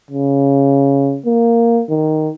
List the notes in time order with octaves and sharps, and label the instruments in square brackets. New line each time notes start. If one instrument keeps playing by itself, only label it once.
[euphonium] C#3
A#3
D#3